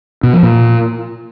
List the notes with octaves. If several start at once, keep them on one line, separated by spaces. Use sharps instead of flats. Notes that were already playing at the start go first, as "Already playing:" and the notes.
B2
F3
A#2